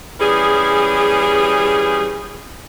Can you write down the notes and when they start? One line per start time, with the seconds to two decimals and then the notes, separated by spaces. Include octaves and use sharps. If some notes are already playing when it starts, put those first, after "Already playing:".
0.20 E3 G3 C#4 G#4